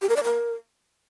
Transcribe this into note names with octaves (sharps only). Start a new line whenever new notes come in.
G4
A#4
D5
A#4